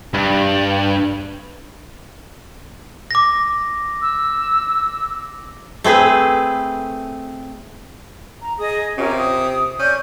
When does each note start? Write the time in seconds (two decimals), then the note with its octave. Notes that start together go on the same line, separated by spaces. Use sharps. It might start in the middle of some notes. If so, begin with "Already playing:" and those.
0.14 G2
3.11 D6 A#6
4.02 E6
5.84 A3 C4 G#4 B4
8.41 A#5
8.59 G#4 D#5 D#6
8.98 C3 C#4 F4 A#4
9.16 D#6
9.79 C#4 D5 G6